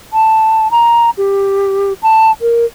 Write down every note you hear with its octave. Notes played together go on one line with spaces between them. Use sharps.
A5
A#5
G4
A5
A#4